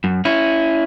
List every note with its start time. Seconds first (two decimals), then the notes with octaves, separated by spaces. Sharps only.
0.04 F#2
0.25 C#4 E4